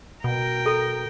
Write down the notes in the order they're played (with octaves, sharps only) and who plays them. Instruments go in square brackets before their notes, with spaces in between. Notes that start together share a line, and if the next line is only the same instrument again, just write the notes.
[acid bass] B2 [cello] A#4 G5
[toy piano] A4